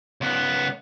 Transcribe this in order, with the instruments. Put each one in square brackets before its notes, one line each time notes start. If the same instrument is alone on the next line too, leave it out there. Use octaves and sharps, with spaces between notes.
[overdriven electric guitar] C#2 B3